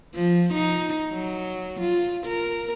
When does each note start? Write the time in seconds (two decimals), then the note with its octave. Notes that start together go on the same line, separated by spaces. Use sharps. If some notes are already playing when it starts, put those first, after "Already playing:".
0.15 F3
0.54 D#4
1.12 F#3
1.80 F4
2.27 A#4